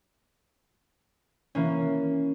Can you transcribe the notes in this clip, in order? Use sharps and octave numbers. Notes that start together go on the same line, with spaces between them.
E3 A#3 C#4